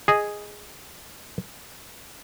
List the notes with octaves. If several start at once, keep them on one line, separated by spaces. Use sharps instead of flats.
G#4 D#5